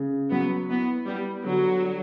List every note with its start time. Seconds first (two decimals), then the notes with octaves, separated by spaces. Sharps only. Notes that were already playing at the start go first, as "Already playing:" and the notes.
Already playing: C#3
0.31 F#3 B3
0.69 B3 E4
1.07 G3 B3
1.44 D3 F#3
1.82 G3